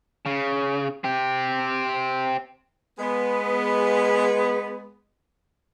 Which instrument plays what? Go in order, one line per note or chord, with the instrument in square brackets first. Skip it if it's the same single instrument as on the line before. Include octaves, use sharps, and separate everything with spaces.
[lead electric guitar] C#3
C4 G4
[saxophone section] G#3 B3